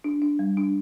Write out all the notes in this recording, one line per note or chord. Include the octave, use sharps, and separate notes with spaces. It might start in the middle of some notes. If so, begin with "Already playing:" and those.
D4
D4
G3
D4